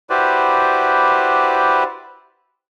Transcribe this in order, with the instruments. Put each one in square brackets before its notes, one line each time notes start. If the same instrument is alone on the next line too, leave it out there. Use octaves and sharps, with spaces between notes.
[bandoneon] E4 F#4 G4 B4 C5 D5